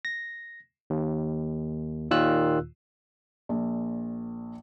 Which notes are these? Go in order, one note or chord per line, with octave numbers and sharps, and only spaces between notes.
A#6
D#2
D#2 A#2 D#3 F4 E6 F#6
A#1 A#2